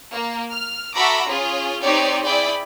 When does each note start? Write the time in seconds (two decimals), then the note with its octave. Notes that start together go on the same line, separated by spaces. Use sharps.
0.13 A#3
0.53 F6
0.94 F#4 A4 E5 A#5 B5 D6
1.28 C#4 F4 G#4
1.82 C4 D#4 G4 C#5 D5
2.25 E4 G#4 D5 G5 B5